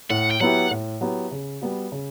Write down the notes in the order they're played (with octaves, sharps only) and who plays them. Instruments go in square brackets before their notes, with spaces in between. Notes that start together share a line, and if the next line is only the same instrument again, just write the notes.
[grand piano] A2 [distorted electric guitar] F#5
[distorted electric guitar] G5
[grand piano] F#3 B3 E4 G4 [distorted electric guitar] F#5
[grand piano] A2
F#3 B3 E4 G4
C#3
G3 B3 F#4
C#3